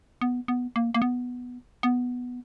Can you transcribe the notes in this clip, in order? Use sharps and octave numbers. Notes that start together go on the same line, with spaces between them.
B3
B3
A#3
A#3
B3
B3